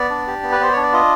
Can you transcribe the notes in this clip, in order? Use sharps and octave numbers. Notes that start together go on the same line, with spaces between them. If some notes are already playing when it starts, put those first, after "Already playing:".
Already playing: B3 D5
D4
G4
B3
B4
B3 C5
D4 C#5
D5
F4 D#5